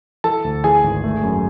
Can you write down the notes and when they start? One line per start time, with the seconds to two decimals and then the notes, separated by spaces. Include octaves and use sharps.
0.24 E3 A4 A5
0.44 D2
0.64 E3 G#4 G#5
0.84 G#1
1.04 A3
1.23 F#2